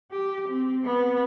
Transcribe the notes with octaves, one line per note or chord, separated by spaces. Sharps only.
G4
C4
B3